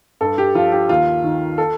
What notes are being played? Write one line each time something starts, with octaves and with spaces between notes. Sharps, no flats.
G2 A4
G4
F3 F4
G4
D#2 F4
D#3
A4